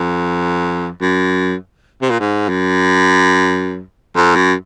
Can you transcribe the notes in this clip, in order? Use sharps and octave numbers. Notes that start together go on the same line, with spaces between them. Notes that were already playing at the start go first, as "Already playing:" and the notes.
Already playing: F2
F#2
C3
A#2
G#2
F#2
F2
F#2